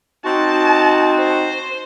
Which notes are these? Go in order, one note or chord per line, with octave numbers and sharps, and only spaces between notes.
C4 D#4 F#4 A5
C5